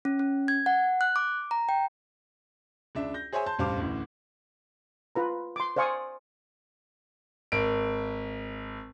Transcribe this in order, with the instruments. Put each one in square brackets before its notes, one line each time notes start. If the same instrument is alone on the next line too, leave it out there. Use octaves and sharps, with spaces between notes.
[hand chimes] C#4
C#4
G#6
F#5
F#6
D6
A#5
G5
[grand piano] C#2 D4 E5
G6 A#6
G#4 C5 C#5 E5 G#5
A5 C6 G6
A1 G2 C5 F5 A5 D6
A1 D2 E3
[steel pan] F4 B4 A#5
C6 D6
C5 D5 F5 G#5 C#6 D#6
[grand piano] G#1 D7